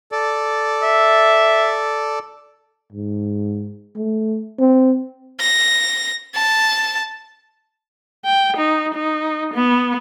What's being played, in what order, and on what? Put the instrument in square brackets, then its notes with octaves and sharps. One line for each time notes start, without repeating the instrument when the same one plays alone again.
[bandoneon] A4 D5
[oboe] E5
[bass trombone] G#2
A3
C4
[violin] A#6
A5
[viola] G5
D#4
D#4
B3